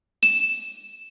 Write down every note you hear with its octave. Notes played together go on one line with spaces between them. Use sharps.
E7